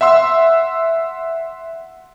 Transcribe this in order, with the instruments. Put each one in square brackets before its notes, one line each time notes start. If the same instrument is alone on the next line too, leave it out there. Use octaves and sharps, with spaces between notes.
[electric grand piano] E5 F#5 C6 E6